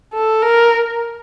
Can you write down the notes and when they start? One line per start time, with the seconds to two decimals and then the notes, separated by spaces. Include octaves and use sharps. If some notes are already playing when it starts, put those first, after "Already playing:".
0.14 A4
0.43 A#4